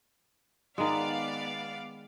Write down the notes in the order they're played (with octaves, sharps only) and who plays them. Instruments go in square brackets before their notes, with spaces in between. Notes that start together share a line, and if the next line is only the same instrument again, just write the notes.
[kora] D#3 G#3 [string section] B3 D5 F5